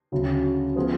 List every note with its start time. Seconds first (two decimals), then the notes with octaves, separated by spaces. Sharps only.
0.12 D2 C#3 F#3
0.76 F3 B3 F4 G#4 B4